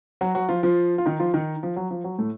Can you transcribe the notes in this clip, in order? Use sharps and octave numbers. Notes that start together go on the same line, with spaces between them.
F#3 F#4
F#3 F#4
F3 F4
F3 F4
F4
D#3 D#4
F3 F4
D#3 D#4
F3
F#3
F3
F#3
A2 A3